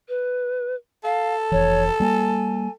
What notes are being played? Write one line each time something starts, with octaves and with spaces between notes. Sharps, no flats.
B4
A4 F5
F1 E3 C#5
G3 A#3 G#5